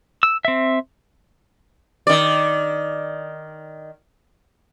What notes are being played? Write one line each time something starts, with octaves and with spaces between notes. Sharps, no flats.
E6
C4 E5
D#3 D5